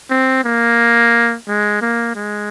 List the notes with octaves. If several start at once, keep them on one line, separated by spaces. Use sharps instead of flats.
C4
A#3
G#3
A#3
G#3